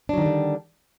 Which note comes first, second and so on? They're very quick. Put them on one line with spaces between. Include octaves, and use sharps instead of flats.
D4 F#3 D#3 G3 D3